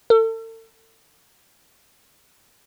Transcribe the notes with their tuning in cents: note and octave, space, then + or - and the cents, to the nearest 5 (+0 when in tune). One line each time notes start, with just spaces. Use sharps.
A4 +40